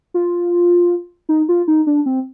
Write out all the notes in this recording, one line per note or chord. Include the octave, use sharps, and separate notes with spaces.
F4
D#4
F4
D#4
D4
C4